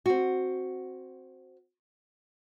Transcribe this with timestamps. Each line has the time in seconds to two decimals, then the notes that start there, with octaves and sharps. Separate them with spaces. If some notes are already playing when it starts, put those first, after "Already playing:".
0.06 C4 F#4